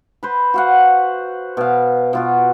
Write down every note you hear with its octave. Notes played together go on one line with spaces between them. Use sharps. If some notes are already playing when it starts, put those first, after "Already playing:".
B4 C5
F#4 F5 F#5
B2 F5
B2 F4 F#4